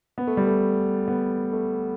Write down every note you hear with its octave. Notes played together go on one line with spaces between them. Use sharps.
B3
A3
G3
A3
B3
A3